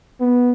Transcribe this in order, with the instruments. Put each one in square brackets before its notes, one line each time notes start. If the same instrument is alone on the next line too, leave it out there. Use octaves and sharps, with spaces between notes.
[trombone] B3